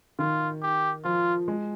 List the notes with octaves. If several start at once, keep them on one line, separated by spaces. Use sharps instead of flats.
D#3 F4
G4
F3 F4
G#3